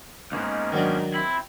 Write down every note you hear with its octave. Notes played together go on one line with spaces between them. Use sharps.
C#2 G#2 A#3 B3 C#4
D#3 F#3 D4
C4 E4